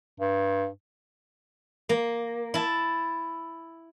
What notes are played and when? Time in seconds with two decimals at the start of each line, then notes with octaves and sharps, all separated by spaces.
0.20 G2
1.89 A#3
2.54 E4 A5